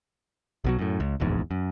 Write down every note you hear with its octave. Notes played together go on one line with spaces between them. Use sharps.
B1 B2 F#3
F#2 A2
C#2
D1 A#1 E2 G#2
F#2